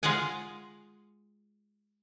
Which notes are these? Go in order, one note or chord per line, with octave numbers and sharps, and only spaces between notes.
G#3 F4 G#4 F#5 G#5